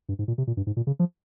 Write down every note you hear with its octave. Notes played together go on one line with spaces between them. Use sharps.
G2
G#2
A#2
C3
A#2
G2
G#2
A#2
C#3
F3